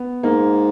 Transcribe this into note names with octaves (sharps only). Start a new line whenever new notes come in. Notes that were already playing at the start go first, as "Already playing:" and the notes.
Already playing: B3
G#2 A#3